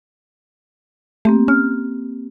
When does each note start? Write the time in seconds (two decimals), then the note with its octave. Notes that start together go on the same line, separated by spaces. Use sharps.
1.25 A3 A#3 C4 G4
1.48 C#4 F6